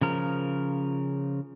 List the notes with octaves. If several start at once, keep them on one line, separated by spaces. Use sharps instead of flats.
C#3 F3 A#4